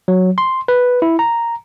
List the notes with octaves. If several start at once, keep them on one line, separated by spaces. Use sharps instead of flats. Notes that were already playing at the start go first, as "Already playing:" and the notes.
F#3
C6
B4
E4
A#5